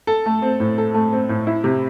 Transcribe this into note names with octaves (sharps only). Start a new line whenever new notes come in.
A4
A3
C4
A2
A4
A3
C4
A2
E4
C3